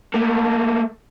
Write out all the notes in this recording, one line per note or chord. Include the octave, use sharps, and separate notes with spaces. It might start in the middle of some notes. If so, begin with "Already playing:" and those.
A3 A#3